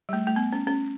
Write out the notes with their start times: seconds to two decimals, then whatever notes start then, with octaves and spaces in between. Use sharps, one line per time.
0.09 G3
0.13 A3
0.27 A3
0.36 B3
0.53 C#4
0.67 C#4